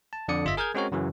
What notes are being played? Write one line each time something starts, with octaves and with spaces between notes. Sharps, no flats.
A5
F2 D3 D4 D5 D#6 C#7
G1 F4 D#5 E5 B6
G#4 A#4 G#5 F6 G6 G#6
G#3 C4 C#4 F#4 A#4 C#5
F#2 C#3 E3 F#3